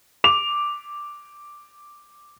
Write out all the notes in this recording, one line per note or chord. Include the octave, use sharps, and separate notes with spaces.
D6 F7